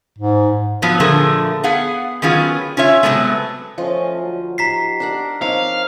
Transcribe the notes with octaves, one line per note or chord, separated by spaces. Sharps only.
G#2
F3 F#3 B3
A#2 D3 F3 A3 G#4 A#4
B3 G#4 F5 F#5
D#3 F#3 B3 C#4 F4 G#4
C#4 F4 C#5 E5
C3 F#3 G#3 A3 B3
F3 A3 C#4 F4 D#5
D2 F#3
D#4 F#4 G4 A#5 B6 C7
D4 A#4 F#5
F3 A#3 C4 D#4 C#5 F5 D6